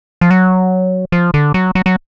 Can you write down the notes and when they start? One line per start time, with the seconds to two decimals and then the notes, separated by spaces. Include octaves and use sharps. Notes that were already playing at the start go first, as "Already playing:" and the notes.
0.21 F3
0.31 F#3
1.12 F3
1.34 D3
1.54 F#3
1.75 F#3
1.86 F#3